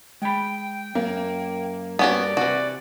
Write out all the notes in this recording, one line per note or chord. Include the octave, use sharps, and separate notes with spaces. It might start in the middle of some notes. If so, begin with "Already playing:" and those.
G#3 G5 B5
F#2 A#3
G2 B3 C#4 F#4 D5
C3 E3 F#4